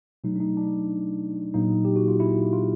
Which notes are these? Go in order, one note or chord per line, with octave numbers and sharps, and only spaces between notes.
B2 F#3 A3 D#4
D4
D#4
D4
A#2 F#3 A#3 D#4
G4
F#4
F4
E4
F4